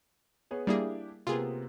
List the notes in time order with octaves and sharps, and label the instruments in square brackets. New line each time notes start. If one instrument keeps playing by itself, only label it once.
[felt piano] B3 G#4 C#5
[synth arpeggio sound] G3 A#3 G#4 [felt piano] D4 E4 G4
[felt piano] C3 A#3 B3 [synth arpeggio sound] F4 G#4